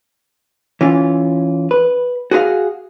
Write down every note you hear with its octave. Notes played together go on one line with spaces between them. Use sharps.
E3 C#4 F4
B4
F#4 G#4 B4 F5